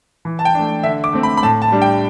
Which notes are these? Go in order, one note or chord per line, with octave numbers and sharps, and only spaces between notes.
E3
A5
G5
A3 D4
D3 E5
D6
A3 C4
B5
B5
A2 A5
A5
G3 D4
G5